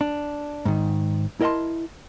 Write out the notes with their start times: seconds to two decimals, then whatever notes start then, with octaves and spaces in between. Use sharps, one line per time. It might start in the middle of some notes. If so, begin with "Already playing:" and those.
0.01 D4
0.66 G#2 D#3
1.41 E4 A#4 D#5 F5 A5 C6